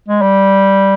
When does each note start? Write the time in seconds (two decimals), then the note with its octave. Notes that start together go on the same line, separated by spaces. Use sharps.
0.08 G#3
0.22 G3